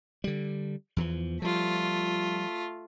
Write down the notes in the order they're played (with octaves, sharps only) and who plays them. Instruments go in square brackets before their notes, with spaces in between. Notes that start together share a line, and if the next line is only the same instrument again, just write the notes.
[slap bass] D3 G3
E2 E3 F3
[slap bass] F3 G3 [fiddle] A3 F4